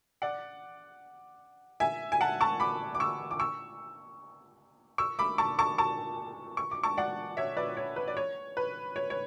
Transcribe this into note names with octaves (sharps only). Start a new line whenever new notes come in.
D5 F#5
E5 G#5
G#5
F#5 A5
A5 C#6
B5 D6
D6
C#6 E6
D6
C#6 E6
C#6 E6
B5 D6
A5 C#6
A5 C#6
A5 C#6
C#6
D6
A5 C#6
D5 F#5
C#5 E5
B4 D5
C#5
B4
D5
C#5
B4
C#5
C#5